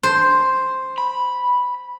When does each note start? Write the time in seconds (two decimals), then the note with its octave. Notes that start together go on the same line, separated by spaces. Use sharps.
0.03 C5
0.98 B5